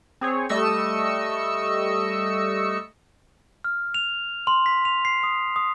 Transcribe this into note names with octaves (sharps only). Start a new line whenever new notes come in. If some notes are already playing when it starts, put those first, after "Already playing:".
C4 G#4 C#5
G3 A3 D#5 C#6 E6 C#7
F6
F7
C6
B6
F7
C7
D#6
D#6